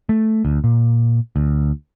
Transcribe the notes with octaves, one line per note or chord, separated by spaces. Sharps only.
A3
D2
A#2
D2